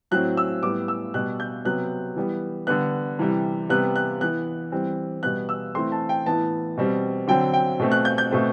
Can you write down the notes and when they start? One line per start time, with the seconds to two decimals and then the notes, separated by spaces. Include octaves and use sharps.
0.11 A2 F#3 C4 F#6
0.37 E6
0.63 A2 G3 B3 D6
0.88 E6
1.14 B2 G3 B3 F#6
1.40 G6
1.65 C3 F#3 B3 F#6
2.16 E3 G3 B3
2.67 D3 G3 B3 F#6
3.19 C3 E3 G3
3.69 C3 G3 B3 F#6
3.96 F#6
4.21 E3 B3 F#6
4.72 E3 G3 C4
5.23 B2 G3 B3 F#6
5.49 E6
5.75 E3 A3 C4 C6
5.92 A5
6.09 G5
6.26 A2 E3 B3 A5
6.77 B2 G3 C4
7.28 D3 F#3 C4 G5
7.54 G5
7.79 B2 A3 C4
7.92 F#6
8.05 G6
8.18 G6
8.31 B2 A3 C4